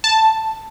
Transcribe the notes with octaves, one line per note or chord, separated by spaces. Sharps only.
A5